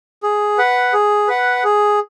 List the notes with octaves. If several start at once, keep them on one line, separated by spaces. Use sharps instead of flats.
G#4
B4 F#5
G#4
B4 F#5
G#4